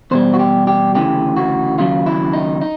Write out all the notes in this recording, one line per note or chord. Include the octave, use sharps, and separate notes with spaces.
E2 B2 G3 C5
F#4
G4
G4
D2 C#3 E3 G4
F#4
D#2 C#3 F#3 F4
E4
D#4
D#4